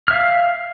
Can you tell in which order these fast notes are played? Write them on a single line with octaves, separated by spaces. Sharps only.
F6 E5 F5